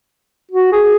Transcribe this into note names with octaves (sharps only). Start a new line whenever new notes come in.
F#4
G#4